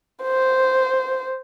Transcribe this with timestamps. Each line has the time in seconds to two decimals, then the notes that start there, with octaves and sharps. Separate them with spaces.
0.23 C5